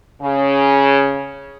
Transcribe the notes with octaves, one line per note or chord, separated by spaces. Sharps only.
C#3